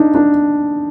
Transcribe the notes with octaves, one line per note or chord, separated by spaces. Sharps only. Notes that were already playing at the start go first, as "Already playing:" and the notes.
Already playing: D4 D#4
D4